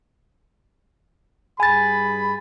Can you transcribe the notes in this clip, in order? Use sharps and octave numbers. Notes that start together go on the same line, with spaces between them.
G2 G#4 G#5 B5 A6